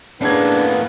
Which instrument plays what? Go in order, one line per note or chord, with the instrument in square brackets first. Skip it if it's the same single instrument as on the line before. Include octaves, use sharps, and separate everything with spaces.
[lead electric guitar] A2 A#3 [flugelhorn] B3 [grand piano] C#4 G#4 G#6 [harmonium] D4